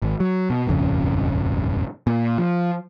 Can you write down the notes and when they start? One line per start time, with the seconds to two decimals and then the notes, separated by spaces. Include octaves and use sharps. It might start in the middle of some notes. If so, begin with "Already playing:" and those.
0.02 G#1
0.20 F#3
0.50 B2
0.67 D#1 G#1 F2 C#3
2.07 A#2
2.38 F3